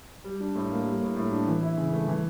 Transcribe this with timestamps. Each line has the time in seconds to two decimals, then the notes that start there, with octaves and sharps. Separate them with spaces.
0.24 G3
0.40 D4
0.55 A2
0.70 A#3
0.85 G3
1.02 A2
1.16 A2
1.31 D4
1.47 E3
1.62 E4
1.77 C#3
1.93 A3
2.08 E3